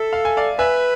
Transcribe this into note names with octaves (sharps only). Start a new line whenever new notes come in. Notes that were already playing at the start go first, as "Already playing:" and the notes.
Already playing: A4 E5
F5
G#5
D5 F5
B4 E5 G#5